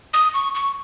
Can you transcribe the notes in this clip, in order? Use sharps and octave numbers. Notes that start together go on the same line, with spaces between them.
D#6
C#6
C#6